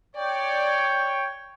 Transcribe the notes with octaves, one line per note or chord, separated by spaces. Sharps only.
C#5 D5 G5